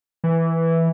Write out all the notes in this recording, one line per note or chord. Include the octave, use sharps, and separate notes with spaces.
E3